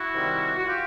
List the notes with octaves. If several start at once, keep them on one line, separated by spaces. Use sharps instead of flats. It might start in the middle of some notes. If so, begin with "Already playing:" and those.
Already playing: E4 F#4
C3 D#3 G3 C4
F#4
F4 G4